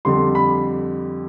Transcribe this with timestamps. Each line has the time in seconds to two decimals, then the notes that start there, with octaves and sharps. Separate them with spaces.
0.05 F2 D3 G3 C6
0.35 B5